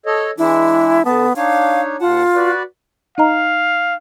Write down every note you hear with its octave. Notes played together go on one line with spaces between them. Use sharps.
A4 C#5 D#5
E3 G#3 D4 E4
D3 B3 A5
D4 D#4 C#5 F5
D#2 F4 F#5 A5
F#4 B4 D5
D#4 D#5 F5 A#5